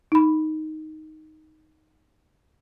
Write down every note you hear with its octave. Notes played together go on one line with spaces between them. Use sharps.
D#4 B5